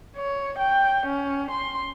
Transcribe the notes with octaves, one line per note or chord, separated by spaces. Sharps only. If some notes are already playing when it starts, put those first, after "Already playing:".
C#5
G5
C#4
C6